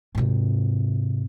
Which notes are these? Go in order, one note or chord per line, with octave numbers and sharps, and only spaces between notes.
G#2 C3